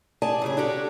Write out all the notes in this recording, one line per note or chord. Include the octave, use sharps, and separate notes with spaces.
G4 G#4 D5 G#5 A5
A#2 C#3 G#4
D4 F#4 G4 A4